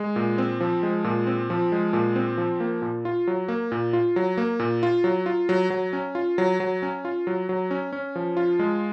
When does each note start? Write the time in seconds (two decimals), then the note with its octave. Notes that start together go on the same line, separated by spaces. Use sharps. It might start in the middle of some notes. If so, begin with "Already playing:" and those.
Already playing: G#3
0.16 A#2
0.38 C4
0.60 F3
0.83 G#3
1.04 A#2
1.27 C4
1.50 F3
1.72 G#3
1.93 A#2
2.16 C4
2.38 F3
2.60 A#3
2.82 A#2
3.05 F4
3.27 F#3
3.48 A#3
3.72 A#2
3.93 F4
4.16 F#3
4.37 A#3
4.59 A#2
4.83 F4
5.04 F#3
5.26 F4
5.49 F#3
5.70 F#3
5.93 C#4
6.15 F4
6.38 F#3
6.60 F#3
6.82 C#4
7.05 F4
7.27 F#3
7.49 F#3
7.71 C#4
7.93 C#4
8.15 F3
8.37 F4
8.59 G#3